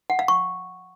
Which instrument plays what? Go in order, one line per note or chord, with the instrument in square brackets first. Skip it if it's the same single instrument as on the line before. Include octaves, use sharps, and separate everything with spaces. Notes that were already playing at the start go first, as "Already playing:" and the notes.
[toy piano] F#5
F5
C#6